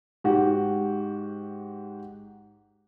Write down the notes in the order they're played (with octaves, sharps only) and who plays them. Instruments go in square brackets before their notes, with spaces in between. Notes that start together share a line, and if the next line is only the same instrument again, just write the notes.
[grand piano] G#2 F#4 G4